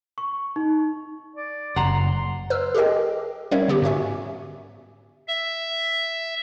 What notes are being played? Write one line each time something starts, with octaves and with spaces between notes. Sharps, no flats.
C#6
D#4
D5
F#1 F#5 A#5 C6
B4 E6 F6
G4 G#4 A#4 D#5 G5
G3 C#4 A#4 C#5 E5 F5
D3 B3 G4
G#2 F#4 E5 G#5
E5